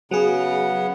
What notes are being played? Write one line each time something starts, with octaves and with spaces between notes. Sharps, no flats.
C#3 F#3 B3 G#4 F#5